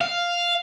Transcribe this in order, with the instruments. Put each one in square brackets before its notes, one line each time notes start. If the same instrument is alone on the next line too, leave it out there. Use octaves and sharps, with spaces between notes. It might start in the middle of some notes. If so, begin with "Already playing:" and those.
[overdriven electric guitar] F5